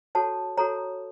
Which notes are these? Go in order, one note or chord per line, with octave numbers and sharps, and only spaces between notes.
F#4 A4 C#5 A5
F#4 A4 C#5 A#5